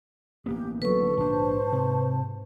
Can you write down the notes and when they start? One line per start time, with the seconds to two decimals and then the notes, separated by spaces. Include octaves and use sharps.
0.46 A1 A#3 B3 G4
0.82 D3 F#3 A4 B4 C#6
1.17 A#1 G#2 D4 C5 A5
1.72 C3